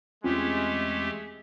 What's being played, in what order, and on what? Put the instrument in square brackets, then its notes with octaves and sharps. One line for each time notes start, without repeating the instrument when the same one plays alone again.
[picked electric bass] E2 C4 C#4 [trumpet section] G#3 [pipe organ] A3 G4 [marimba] F4